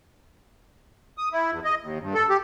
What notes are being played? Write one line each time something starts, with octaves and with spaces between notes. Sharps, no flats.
D#6
E4
E2
D#5
D#2
G2
A4
G4